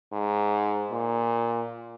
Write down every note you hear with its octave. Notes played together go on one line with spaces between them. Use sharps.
G#2
A#2